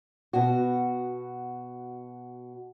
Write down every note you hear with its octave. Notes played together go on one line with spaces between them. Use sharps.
B2 F#4